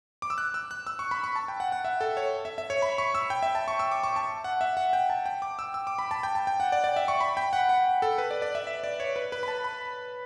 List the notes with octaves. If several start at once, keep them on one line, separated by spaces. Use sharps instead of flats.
D6
E6
F#6
E6
F#6
E6
C#6
B5
C#6
A5
G5
F#5
F#5
E5
A4
C#5
E5
E5
C#5
B5
C#6
E6
G5
E5
A5
C#6
E6
D6
C#6
A5
F#5
E5
F#5
G5
A5
G5
D6
E6
E6
D6
B5
A5
G5
A5
G5
F#5
D5
D5
E5
C#6
B5
G5
F#5
F#5
A4
B4
D5
D5
E5
E5
D5
C#5
B4
B4
B5
A5
B5